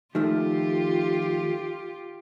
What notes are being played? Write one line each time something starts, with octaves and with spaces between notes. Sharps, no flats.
D#3 F3 A3 F4 G4